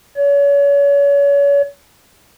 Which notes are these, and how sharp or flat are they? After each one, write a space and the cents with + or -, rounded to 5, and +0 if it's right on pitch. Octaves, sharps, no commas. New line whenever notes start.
C#5 +35